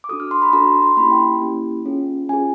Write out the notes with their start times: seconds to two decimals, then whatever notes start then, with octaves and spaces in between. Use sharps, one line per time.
0.04 D6
0.09 D4 F#4 A4 D#6
0.20 F6
0.31 C6
0.42 B5
0.53 D4 F#4 A4 A#5
0.68 C6
0.83 C6
0.97 A#3 C#4 E4 G4 B5
1.12 G5
1.41 A#3 C#4 E4 G4
1.86 C#4 F4 G#4
2.29 C#4 F4 G#4 G#5